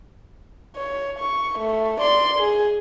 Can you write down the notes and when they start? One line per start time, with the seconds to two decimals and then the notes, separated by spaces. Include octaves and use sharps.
0.76 C#5
1.19 C#6
1.58 A3
2.00 D5 C6
2.38 G#4